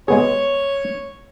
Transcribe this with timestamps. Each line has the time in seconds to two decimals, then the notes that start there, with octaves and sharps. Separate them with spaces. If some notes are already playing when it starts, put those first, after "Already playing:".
0.08 G#3 B3 G#4 C#5